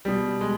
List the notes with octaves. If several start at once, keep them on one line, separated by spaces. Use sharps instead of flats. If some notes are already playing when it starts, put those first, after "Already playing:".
B2 G3
G#3